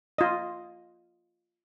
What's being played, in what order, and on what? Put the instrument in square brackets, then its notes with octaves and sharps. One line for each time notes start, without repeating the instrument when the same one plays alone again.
[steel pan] F4 D#5